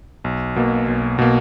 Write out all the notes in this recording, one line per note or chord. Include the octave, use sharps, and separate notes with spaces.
B1
B2 A#3
B1
B2 A#3